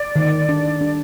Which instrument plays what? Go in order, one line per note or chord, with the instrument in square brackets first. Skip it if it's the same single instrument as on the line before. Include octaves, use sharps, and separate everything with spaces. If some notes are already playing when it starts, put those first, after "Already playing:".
Already playing: [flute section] D5
[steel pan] D#3
D4
D4